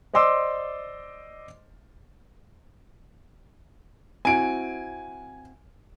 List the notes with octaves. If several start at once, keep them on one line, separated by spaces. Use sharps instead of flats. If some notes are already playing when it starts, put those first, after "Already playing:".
C5 D5 D#5 C6 D6 E6
C4 E4 F#4 G#5 D7